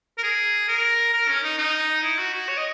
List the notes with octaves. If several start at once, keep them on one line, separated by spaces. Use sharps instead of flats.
A#4
G#4
A#4
A#4
C#4
D#4
D#4
E4
F#4
F#4
C#5
D#5